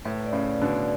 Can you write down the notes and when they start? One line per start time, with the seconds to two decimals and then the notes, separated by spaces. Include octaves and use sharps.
0.05 A2 B4
0.26 D5
0.33 A2 C#3
0.47 D5
0.61 B2 D3
0.69 D5